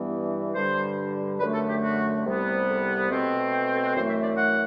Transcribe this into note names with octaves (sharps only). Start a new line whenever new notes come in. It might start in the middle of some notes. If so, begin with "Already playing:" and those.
Already playing: G2 E3 G3 B3
G2 D3 G3 C5
F#2 D3 A3 B4
A4
G4
F#4
C2 C3 G3 B3
A4
B2 A3 C4
G5
A4
B4
F#2 E3 A3 C5
E5
D5
F#5